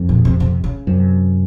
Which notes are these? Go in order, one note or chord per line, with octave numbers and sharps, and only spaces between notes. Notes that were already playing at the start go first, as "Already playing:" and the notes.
Already playing: F2
A#2
C3
C3
C#3
F#2 C3